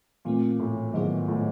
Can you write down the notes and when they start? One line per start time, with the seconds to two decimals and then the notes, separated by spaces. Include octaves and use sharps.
0.25 A#2 E3 A3 C4
0.60 A2
0.94 G#2 D#3 F#3 B3 E4 G#4
1.28 A2